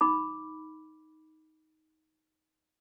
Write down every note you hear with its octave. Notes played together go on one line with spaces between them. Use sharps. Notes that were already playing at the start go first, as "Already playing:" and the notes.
D#4 B5 D6